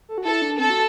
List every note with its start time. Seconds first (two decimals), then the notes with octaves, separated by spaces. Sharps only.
0.09 A4
0.18 F#4
0.25 E4 A4
0.42 D4
0.58 C4 A4
0.70 F#4